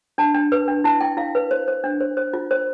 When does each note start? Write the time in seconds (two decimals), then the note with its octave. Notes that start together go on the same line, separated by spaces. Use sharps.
0.18 D4 A5
0.34 D4
0.52 B4
0.68 D4
0.84 E4 A5
1.00 E4 G5
1.17 E4 F5
1.35 B4
1.51 C5
1.68 C5
1.84 D4
2.00 C5
2.17 C5
2.34 F4
2.51 C5